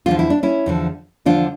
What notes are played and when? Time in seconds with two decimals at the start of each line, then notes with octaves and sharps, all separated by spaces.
0.06 E2 D3 F3 F4
0.19 E4
0.30 D4
0.43 C#4 E4
0.66 E2 D3 F3
1.25 E2 D3 F3 D4 F4